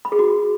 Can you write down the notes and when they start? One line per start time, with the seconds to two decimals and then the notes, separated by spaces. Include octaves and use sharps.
0.05 B5
0.12 G#4
0.19 F#4